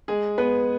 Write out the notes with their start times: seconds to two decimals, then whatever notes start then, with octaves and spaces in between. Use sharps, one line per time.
0.08 G#3 G#4
0.38 B3 B4